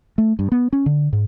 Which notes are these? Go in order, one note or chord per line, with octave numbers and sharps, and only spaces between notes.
A3
G2
B3
C#4
D3
G#2